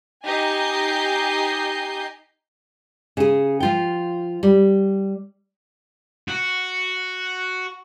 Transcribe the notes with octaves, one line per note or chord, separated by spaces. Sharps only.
D#4 G4 D#5 G#5 G6 C7
C#3 G#4
F3 F4 G5
G3
F#4